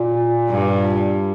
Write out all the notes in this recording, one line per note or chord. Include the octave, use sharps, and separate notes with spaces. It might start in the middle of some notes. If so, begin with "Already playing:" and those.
Already playing: A#2
G2